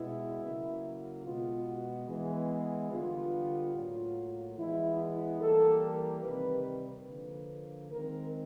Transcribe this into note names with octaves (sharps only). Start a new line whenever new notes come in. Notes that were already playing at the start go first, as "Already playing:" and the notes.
Already playing: B2 G#3 B3 E4
C#3 F#3 A#3
B2 G#3 B3 F4
F#4
E3 G#3 B3
D3 G3 B3 F4
A2 F#3 A#3 F4
E3 G#3 B3 E4
E4
E3 G3 A#3 A4
A#4
C3 D#3 G3 B4
B4
D3 F3 A#3
D#3 G#3 C4 A#4